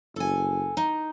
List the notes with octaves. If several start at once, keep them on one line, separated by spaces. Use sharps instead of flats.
F#1 A4 G#5
D#4